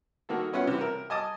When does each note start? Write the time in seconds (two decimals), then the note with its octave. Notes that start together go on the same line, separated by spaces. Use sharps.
0.29 D#3 A#3 F#4 A4
0.53 B3 C#4 E4 F4 F#5
0.67 C3 E3
0.81 A#4
1.10 D#5 G#5 A5 D6 D#6